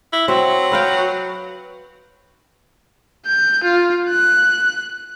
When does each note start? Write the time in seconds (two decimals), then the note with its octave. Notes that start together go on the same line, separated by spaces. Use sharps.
0.13 E4
0.28 F#3 C4
0.72 B4 F5 G5
3.26 G6
3.64 F4
4.09 F#6